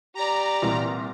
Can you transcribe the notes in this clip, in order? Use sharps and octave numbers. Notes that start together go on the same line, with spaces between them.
G4 D5 A#5
C2 A#2 E3